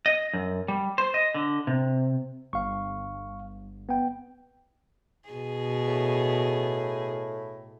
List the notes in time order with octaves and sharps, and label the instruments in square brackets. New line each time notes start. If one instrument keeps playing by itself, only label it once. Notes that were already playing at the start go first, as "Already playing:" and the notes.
[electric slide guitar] D#5
F#2
G3
C5
D#5
D3
C3
[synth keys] G1 [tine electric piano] F5 C#6
[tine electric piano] B3 G5
[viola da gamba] B2 G#4
[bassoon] A2